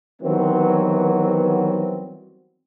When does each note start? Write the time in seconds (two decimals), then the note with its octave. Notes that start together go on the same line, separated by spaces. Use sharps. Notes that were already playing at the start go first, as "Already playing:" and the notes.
0.22 D#3 E3 F#3 G3 B3 C4